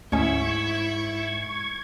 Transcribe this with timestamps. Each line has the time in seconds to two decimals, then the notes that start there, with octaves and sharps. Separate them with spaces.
0.12 D2 G#2 C#4 E4 E5 C#6 G#6